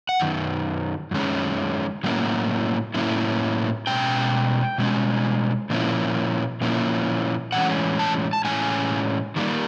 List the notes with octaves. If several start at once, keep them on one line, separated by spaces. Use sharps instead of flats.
F#5
F#2 D#3
F#2 D#3 G#3 C#4
A2 F#3 A#3 C#4 E4
A2 F#3 A#3 C#4 E4
B2 G#3 C#4 G5
B2 G#3 C#4
A#2 F3 A#3 C#4 E4
A#2 F3 A#3 C#4 E4
A2 E3 G#3 C#4 F#5
A5
A5
A2 E3 G#3 C#4 G#5
D#3 G3 A#3